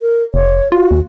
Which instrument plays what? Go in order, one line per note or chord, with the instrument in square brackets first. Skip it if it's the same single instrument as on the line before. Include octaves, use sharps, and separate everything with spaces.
[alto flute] A#4
[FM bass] F1 [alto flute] C#5
[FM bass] F4 [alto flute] F#4
[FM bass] D#2